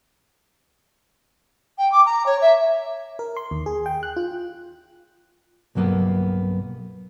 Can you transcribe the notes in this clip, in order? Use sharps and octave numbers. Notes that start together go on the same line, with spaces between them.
G5
D6
A#5
C#5
E5
A#4
C6
D#2
G#4
G5
F#6
F4
B1 G2 F#3 A#3 B3